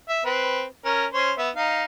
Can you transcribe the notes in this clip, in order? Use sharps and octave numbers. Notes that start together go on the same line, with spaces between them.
E5
C4 B4
C#4 A#4
C#4 C5 C#5
B3 E5
D#4 F5